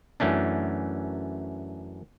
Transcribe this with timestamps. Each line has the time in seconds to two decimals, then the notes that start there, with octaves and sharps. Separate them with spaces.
0.20 F#2 E3 A3 C#4 D4